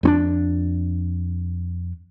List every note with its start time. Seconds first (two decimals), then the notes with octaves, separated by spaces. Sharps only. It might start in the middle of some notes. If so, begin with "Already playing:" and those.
0.03 F2 C4 D4